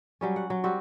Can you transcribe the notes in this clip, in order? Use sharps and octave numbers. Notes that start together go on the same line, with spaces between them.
F#3 G3 C#4
F#5
F#3
G3 C4 F#4